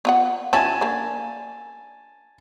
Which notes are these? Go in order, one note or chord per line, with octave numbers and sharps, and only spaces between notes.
B3 F4 F#5
F3 C#4 E4 G#5 A5
A#3 D4